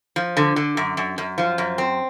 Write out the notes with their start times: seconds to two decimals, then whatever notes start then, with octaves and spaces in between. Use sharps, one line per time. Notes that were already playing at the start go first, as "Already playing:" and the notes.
0.16 F3
0.37 D3
0.56 D3
0.77 F#2
0.97 F#2
1.18 F#2
1.38 F3
1.58 F#2
1.78 C4